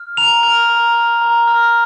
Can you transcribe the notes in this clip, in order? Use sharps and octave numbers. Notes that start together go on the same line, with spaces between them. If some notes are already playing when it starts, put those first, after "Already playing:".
Already playing: F6
A#5 F7
F6 F7
A#5
F6
A#5
F6